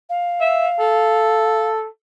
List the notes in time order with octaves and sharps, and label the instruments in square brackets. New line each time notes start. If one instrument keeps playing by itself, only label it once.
[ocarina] F5
[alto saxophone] E5
A4